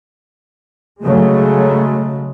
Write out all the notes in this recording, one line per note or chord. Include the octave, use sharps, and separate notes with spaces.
C#3 F#3 G#3 A3